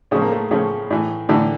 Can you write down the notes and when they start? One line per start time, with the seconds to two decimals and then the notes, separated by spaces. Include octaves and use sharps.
0.11 A2 C#3 F3 C#4
0.22 A#3
0.32 A3
0.51 A2 C#3 F3 C#4
0.90 A2 E3
1.29 A2 D3 E3 D4